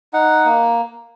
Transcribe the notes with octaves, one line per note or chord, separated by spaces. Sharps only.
D#4 F#5
A#3